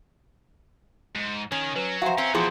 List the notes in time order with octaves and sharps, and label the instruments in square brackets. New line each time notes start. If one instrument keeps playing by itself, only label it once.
[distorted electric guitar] G#2
[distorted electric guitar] D#3 [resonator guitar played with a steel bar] C#4
[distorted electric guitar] F#3 [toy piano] B4
[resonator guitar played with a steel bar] F#4 C5 [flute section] E5 G#5 A#5 [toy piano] F5
[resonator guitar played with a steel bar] C4 [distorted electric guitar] C#4
[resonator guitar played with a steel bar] B2 E3 F3 [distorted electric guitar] B3 C4 [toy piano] G#4 C6